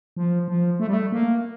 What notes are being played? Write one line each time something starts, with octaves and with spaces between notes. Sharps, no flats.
F3
F3
A3
G3
A3
A#3